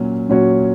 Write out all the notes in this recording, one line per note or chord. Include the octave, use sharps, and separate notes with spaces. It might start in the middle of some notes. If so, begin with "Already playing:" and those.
Already playing: A#2 F#3 C#4
A#2 F#3 C#4 F#4 C#5